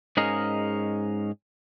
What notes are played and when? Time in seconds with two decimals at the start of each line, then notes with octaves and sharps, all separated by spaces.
0.17 G#2 C#4 G#4 A#4 D#5 F5